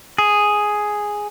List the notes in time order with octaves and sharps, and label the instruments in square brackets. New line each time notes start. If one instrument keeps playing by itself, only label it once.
[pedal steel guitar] G#4